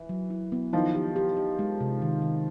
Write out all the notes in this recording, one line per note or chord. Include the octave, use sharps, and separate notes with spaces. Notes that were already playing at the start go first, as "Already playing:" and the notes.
Already playing: E3
F#3
E4
B3
D#3 F3 E4
G4
G4
G4
G#3
C3
D#3
D#3